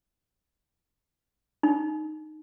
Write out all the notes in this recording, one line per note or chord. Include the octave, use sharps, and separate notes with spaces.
D#4